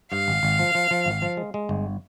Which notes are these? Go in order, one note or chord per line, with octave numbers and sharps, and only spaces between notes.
G2 F5
G#1
G#1
F3
F3
F3
G#1
F3
G#3
G#3
G1